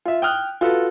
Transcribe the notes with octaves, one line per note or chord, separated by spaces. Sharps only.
F4 E5
G5 D#6 F6 F#6
F4 F#4 A4 B4